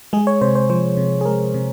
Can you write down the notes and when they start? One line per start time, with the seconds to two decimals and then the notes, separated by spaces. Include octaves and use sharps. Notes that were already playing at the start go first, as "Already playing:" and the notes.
0.13 G#3 G#4
0.27 C#5
0.41 C3 C5
0.56 C5
0.70 F3 C5
0.97 C3
1.21 G#4
1.25 G#3 A#4
1.54 C3